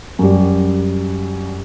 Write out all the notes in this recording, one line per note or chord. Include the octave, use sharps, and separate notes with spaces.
F#2 G3